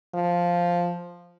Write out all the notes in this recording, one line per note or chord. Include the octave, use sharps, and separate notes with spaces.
F3